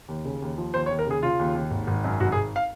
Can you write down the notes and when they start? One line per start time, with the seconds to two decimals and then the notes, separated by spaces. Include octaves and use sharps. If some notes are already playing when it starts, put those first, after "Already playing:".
0.08 D#2
0.25 C#3
0.42 D#2
0.58 F3
0.74 D#2 C5
0.86 C#5
0.90 D#2
0.99 A#4
1.06 C#3 G#4
1.23 C#3 F4
1.39 D#2
1.55 D#2
1.71 G#1
1.87 G#1
2.04 F#2
2.20 G#1 F#4
2.32 G#4
2.36 G#1
2.56 F5